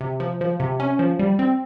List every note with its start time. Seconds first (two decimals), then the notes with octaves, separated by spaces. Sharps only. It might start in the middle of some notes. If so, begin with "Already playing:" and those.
0.01 C3
0.20 F3
0.41 F3
0.60 C3
0.80 C#4
0.99 F3
1.19 G3
1.39 C4